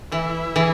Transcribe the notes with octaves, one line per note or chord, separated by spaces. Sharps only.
E3 E4
E3 G#4